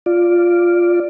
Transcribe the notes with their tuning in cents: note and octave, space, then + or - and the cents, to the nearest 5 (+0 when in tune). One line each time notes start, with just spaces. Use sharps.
F4 +0 D5 +0